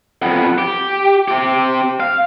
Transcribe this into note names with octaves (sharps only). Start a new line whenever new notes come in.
F2 B3
G4
C4 G4
F5